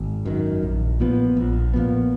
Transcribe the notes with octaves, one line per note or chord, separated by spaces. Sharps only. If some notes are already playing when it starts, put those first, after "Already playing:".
Already playing: G#1
F#2 D#3
A#1
A#2 F3 B3
A#1
A#2 F3 B3